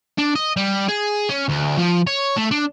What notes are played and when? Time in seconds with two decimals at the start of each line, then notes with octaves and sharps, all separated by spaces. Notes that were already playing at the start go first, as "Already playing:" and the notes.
0.18 D4
0.36 D#5
0.56 G3
0.88 G#4
1.29 C#4
1.48 D2
1.77 F3
2.07 C#5
2.36 A3
2.51 D4